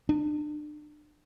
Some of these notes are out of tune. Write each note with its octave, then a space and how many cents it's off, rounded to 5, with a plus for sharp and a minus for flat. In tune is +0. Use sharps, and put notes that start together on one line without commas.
D4 +35